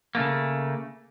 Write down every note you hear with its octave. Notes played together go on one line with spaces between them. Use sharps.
C#3 A3 A#3